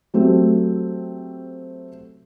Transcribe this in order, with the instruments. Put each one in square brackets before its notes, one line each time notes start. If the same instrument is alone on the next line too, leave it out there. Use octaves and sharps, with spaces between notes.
[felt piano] F#3 A3 C4 G4